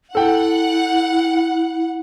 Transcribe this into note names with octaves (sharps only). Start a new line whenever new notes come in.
E4 A4 F#5 G5